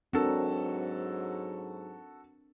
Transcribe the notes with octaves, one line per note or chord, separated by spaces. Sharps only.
G#2 F#3 C4 D4 F#4 A4 A#4